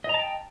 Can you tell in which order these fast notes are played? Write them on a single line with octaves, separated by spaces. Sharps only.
D#5 A#5 A5 G5